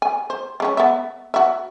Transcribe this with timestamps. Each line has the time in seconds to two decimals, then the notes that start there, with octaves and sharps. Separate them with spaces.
0.02 G#5
0.30 C5
0.60 G#3 C#4 C#5
0.77 B3 E5
1.34 F#4 E5